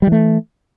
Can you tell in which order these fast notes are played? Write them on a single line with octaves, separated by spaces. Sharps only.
G3 E3 A3